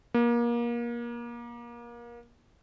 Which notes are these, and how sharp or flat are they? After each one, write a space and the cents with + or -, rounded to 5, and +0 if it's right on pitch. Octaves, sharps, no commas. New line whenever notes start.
A#3 +30